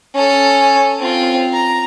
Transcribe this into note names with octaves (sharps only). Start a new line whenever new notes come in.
C#4 A4
C4 F4
A#5